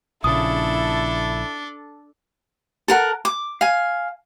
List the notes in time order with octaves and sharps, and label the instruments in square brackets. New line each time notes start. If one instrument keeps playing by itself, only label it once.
[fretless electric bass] A#1 C#3 [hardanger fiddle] D4 A4 [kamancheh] E4 [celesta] D#6
[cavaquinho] A4 A#4 F#5
D6
F5 G#5